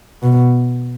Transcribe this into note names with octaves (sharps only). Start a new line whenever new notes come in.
B2